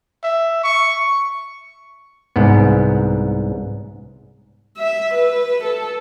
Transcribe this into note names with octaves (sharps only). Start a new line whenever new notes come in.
E5
C#6
C2 G#2 B3
E5
B4
A4